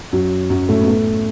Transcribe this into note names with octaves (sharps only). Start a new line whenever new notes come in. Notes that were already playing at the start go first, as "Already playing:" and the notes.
F#2 F#3
F#2 F#3
A2 A3
B3
A2 A3